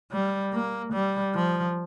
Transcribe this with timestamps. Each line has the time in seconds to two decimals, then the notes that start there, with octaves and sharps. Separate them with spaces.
0.12 G3
0.53 A#3
0.93 G3
1.35 F3